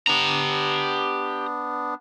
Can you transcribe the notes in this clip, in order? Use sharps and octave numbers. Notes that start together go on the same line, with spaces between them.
B3 D4 G4 A#5